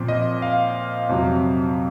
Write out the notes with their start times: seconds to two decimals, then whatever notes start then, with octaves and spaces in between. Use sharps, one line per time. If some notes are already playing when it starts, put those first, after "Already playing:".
Already playing: A#2 F3 C4
0.08 D#5
0.42 F5
1.09 F2 C3 F#3